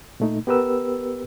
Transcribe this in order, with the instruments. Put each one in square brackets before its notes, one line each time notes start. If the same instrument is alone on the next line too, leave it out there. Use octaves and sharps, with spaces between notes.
[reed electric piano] A#2 A3 D#4
B3 G4 A#4 B4 E6